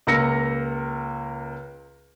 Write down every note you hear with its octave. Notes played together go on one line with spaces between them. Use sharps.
C#2 A#3 F5 E6 A#6 C#7